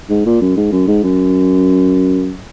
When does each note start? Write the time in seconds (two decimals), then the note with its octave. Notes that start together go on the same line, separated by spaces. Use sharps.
0.09 G#2
0.26 A#2
0.41 F#2
0.57 G#2
0.72 F#2
0.87 G#2
1.04 F#2